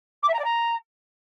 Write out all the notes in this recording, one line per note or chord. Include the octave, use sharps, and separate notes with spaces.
D6
E5
A#5
D5
A#5